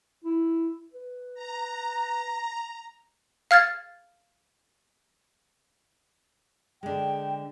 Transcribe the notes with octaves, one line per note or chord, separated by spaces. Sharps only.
E4
B4
A#5
F5 F6 G#6 A6
D3 G#3 G5